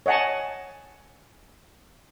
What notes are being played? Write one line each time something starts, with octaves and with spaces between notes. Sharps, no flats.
C#5 D#5 F#5 G#5 A5